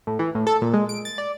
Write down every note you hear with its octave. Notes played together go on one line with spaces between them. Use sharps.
A2
E3
A2
A4
A#2
G#3
D7
A6
D5